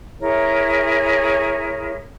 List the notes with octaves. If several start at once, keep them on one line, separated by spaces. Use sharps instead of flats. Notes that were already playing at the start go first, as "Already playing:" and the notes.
E4 G#4 A#4 C#5